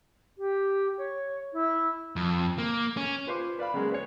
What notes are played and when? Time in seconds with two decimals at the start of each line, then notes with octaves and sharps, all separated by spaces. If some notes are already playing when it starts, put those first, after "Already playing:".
0.37 G4
0.98 C#5
1.53 E4
2.16 F2
2.58 A#3
2.97 C#4
3.27 F4 B4 C5 C6 D6
3.59 B4 D5 F5 B5
3.74 C#3 F#3 G#3 A#3
3.91 B4 C#5